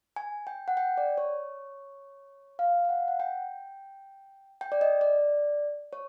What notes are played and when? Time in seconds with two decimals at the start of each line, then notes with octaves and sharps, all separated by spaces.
0.16 G#5
0.47 G5
0.68 F#5
0.77 G5
0.97 D5
1.18 C#5
2.59 F5
2.85 F5
2.89 F#5
3.08 F#5
3.20 G5
4.61 G5
4.72 D5
4.81 D#5
5.01 D5
5.93 C#5